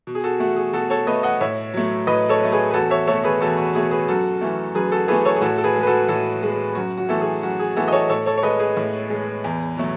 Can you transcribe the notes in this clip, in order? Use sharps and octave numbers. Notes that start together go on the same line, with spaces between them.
B2
G#4
F#4 A4
A3 F#4
G#4
B2 F#4 A4
A4 C#5
A3 B4 D#5
D#5 F#5
A2 C#5 E5
F#3 A3
A2 B4 D#5
A4 C#5
F#3 A3
G#4 B4
B4
E2 F#4 A4
C#5 E5
B2 A3 A4 C#5
G#4 B4
E2 F#4 A4
F#4
B2 A3 G#4
G#4 B4
F#2 F#4 A4
E3 A3
F#2 G#4 B4
F#4 A4
E3 A3 G#4 B4
A4 C#5
G#4
A2 F#4 A4
A4
G#4 B4
G#3
B4
F#4 A4
A2 F#4 A4
G#3
F#2 F#4
F#4
E3 A3 A4
G#4
F#2 F#4
G#4
E3 A3 F#4 A4
D#5
A4 C#5
A2 A4 C#5
A4 C#5
C#5
G#3 B4 D#5
G#4 B4
A2
G#3
E2
B2 F#3 A3